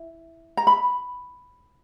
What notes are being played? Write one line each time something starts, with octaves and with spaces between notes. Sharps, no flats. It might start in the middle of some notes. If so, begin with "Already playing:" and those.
Already playing: E4
A#5
B5